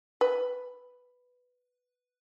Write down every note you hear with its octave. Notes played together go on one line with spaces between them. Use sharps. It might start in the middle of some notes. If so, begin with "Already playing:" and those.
B4